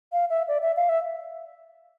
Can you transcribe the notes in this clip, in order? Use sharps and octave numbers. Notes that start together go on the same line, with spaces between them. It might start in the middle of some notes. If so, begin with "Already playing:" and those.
F5
E5
D5
E5
F5
E5